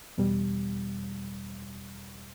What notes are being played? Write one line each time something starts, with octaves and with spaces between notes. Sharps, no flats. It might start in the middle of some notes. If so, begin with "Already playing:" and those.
E2 B2 G3